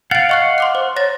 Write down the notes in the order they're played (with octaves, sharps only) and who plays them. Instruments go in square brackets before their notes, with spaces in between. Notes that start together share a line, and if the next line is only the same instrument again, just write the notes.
[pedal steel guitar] F5 F#5 [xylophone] A6 D7
[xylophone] D#5 C#6 F#6
C6 D6 F#6
C5
C#5 A6 A#6